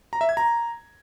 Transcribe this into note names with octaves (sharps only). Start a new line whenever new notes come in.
A#5
E5
G#6
A#5